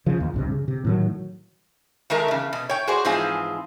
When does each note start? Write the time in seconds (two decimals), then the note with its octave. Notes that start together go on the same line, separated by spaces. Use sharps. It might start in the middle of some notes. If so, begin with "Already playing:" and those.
0.06 C#3 F3
0.20 D#2
0.34 C2 G2 C3
0.52 C#3
0.68 C3
0.85 A2 D#3 F#3
2.10 D#3 G#3 A3 A#4 A#5
2.28 E2 C#3
2.53 B2
2.69 C#5 G5
2.87 F#4 G#4 C5 D5
3.05 G#2 E3 F3 C4 F4 G#4